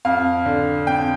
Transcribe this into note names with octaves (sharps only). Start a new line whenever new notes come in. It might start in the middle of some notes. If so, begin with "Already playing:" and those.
F2 F5
D3
F2 G5